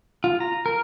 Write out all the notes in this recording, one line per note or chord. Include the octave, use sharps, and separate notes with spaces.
F4
A#5
A#4